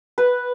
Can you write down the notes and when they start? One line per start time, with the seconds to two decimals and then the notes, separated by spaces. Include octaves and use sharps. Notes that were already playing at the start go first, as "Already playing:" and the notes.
0.18 B4